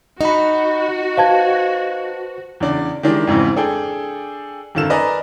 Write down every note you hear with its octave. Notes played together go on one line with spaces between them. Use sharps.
D#4 F#4 D#5 B5
B4 C5 F5 A5 G#6
E2 C#3 D4 D5
D#3 E3 G#3 D4 G4
F2 G#2 C#3 E3
D4 G#4 A4 G5
G#1 F#2 D#3 F4 A4 E7
A#4 B4 D5 D#5 G#5 A#5